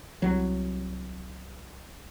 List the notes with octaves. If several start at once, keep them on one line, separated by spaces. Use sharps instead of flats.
C2 F#3